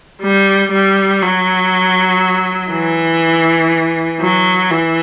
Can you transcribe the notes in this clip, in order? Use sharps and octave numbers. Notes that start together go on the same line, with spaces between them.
G3
G3
F#3
E3
F#3
E3